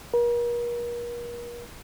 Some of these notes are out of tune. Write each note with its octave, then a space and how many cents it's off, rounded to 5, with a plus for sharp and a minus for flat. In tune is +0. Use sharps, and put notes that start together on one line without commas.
A#4 +40